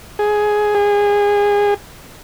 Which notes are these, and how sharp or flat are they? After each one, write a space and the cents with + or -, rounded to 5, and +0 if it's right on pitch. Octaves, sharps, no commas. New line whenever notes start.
G#4 +10
G#4 -25